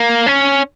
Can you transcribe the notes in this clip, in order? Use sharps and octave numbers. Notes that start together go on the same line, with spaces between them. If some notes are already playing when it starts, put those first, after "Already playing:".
Already playing: A#3
C#4